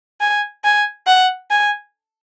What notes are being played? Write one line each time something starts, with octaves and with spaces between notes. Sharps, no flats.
G#5
G#5
F#5
G#5